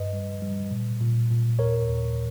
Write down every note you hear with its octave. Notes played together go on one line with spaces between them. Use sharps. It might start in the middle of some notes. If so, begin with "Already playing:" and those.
Already playing: G2 B4 D#5
G3
G3
A#2
A#2
A#2
D#2 A#4 C#5
D#2